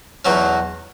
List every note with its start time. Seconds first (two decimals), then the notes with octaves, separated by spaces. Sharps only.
0.25 E2 B2 F#3 C#4